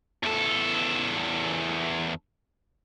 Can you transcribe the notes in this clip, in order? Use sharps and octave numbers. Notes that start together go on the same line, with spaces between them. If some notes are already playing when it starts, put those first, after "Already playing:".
E2 A4